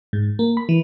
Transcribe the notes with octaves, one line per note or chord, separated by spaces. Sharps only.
G#2
A#3
B5
E3